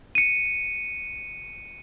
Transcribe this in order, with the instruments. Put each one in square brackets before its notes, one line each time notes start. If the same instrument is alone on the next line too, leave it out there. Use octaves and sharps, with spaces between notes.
[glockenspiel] C#7 D#7